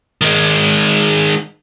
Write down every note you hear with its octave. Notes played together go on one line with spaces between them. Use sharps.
D#3 G#3